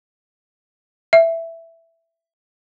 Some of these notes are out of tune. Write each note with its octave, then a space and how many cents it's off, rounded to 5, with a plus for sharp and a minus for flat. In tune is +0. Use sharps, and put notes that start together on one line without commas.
E5 +5